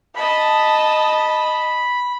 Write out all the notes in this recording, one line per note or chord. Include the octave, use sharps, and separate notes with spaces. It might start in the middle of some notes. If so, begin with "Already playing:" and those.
D#5 A5 B5